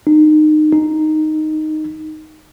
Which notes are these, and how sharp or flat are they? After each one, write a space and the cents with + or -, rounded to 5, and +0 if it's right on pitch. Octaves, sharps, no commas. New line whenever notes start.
D#4 -25
D#4 -5